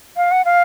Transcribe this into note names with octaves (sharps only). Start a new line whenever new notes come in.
F5
F#5
F5